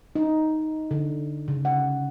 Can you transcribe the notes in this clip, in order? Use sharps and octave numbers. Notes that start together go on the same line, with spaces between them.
D#4
D3
C#3
F#5